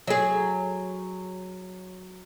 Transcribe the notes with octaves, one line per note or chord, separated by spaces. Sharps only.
F#3 G#4